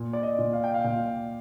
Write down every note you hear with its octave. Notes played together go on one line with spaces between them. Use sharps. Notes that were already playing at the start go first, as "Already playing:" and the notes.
Already playing: A#2
D5
D#5
A#2
F5
G5
F5
A#2 G5